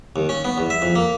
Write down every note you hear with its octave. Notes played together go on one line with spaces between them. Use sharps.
D#2
C#4
B3
E2
E5
F2
A#3